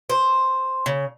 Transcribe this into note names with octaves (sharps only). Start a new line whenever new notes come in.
C5
C#3